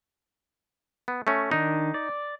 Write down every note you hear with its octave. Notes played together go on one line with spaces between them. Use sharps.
B3
A3 C#4
D#3 D4 D#4
D5